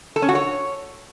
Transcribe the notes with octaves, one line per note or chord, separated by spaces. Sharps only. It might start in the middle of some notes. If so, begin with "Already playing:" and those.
A4
C#4
F#4
C#5